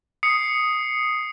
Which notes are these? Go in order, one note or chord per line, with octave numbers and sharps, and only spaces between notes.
D#6 C7 C#7